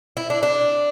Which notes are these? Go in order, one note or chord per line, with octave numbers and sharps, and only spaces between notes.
E4
D4
D4